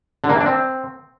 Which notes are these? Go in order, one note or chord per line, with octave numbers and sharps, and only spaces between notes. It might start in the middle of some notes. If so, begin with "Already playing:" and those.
D3
A#3
E3
D4
C4